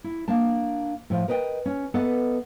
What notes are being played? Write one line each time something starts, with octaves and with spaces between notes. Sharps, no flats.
E4
A#3 D4 A5
A2 F3
A#4 B4 D#5 E5 G5
C#4
B3 A4 B4 D#5 E5 F#5